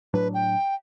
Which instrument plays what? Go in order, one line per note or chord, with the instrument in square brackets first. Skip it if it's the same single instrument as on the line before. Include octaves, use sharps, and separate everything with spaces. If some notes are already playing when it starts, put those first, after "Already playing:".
[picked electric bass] A2 F#3 D4 [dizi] B4
[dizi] G5